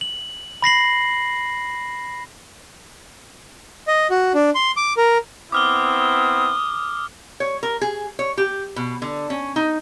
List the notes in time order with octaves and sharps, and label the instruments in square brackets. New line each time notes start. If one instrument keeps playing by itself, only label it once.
[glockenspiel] F#7
B5 A#6 C7 F#7
[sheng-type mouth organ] D#5
F#4
D4
C6
D6
A#4
[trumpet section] B3 C4 E4 [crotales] D6 F6 G7 [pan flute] D#6
[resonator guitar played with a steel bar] C#5
A#4
G#4
C#5
G4
B2
D3
C#4
D#4